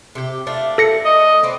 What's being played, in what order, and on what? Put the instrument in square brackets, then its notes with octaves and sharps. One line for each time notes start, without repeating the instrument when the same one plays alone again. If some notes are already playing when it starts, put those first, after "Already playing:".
[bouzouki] C3 G4
A3 D4 F4
[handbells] A4 A#6 C#7
[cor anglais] D#5
[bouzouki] B3 C4 D4